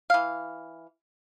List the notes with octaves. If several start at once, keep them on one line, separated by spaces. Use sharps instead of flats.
E3 F5